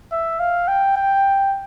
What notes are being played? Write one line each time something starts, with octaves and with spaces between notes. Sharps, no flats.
E5
F5
G5
G5